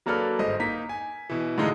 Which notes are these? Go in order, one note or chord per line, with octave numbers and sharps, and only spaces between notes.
F#3 A#3 D4 A4 B4 F6
G1 G#2 C5 D#5
A#3 D#4 B6
G#5
B2 E3
A2 D3 E3 G#3 D#4 F4